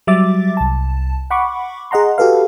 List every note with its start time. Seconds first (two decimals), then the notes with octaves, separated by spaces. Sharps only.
0.07 F#3 G3 E5 D6 A6
0.57 C2 A5
1.30 F#5 B5 C#6 D6
1.91 G#4 D#5 F#5 A#5 C6
2.18 F#4 G4 A4 B4 F5